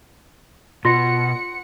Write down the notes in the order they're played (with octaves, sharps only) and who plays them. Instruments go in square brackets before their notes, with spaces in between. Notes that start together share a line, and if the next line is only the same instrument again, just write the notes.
[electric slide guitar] B2 [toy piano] F4 [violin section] F#5 C#7 [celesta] C6 A#6